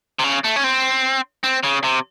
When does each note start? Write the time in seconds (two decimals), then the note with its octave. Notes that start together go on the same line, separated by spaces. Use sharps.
0.19 C3
0.24 C#3
0.44 A3
0.56 C#4
0.64 C4
1.44 C4
1.63 C#3
1.84 C3